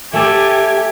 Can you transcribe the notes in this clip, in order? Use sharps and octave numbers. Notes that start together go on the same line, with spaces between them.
A3 G4 A4 D5 G#5 G#6